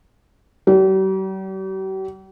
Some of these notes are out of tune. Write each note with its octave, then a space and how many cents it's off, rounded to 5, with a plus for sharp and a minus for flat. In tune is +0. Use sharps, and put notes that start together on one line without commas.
G3 -45